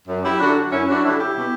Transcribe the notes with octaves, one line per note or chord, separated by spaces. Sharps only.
F#2
E4 G4
D3 F#3 D4 F#4
F#2 C#4 E4
D4 F#4
D3 G3 C#4 E4
E4 G4
B2